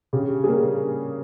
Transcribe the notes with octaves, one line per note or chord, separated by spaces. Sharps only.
C#3 G4
G3 A#3 G#4